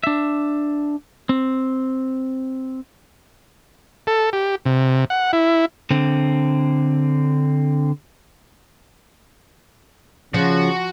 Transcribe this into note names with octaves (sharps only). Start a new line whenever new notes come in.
D4 E5
C4
A4
G4
C3
F#5
E4
D3 C4
C#3 F3 F#4 F#5